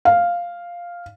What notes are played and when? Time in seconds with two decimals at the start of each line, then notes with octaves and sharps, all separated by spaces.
0.05 F5